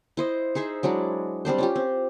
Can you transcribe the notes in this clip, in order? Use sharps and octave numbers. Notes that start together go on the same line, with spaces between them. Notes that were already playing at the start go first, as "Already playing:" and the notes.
E4 C5 D#5
D#4 G#4 C5 E5
F#3 G#3 D4 E4
G3 C4 D4 C5
C#4 F4 G4
C4